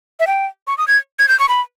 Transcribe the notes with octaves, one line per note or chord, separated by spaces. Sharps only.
E5
G5
C#6
D#6
G#6
G#6
G6
C#6
B5